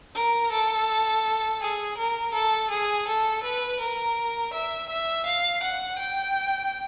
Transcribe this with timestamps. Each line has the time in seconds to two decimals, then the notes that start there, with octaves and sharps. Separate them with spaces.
0.15 A#4
0.51 A4
1.61 G#4
1.97 A#4
2.34 A4
2.71 G#4
3.07 A4
3.43 B4
3.80 A#4
4.53 E5
4.89 E5
5.26 F5
5.63 F#5
5.99 G5